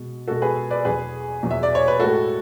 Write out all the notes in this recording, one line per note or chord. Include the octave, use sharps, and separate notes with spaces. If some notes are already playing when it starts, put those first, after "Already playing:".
Already playing: B2 G#3
B2 G#3 F#4 A4
G#4 B4
B4 D5
E2 B2 F#3 G#4 B4
E2 B2 F#3
E5
D5
C#5
B4
A2 G#3 F#4 A4